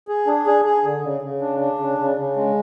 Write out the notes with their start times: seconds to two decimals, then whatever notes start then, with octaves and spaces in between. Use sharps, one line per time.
0.08 G#4
0.27 D4
0.46 G#4
0.65 G#4
0.84 D3
1.03 C#3
1.22 C#3
1.41 D4
1.60 D4
1.79 C#3
1.98 C#3
2.17 C#3
2.36 G#3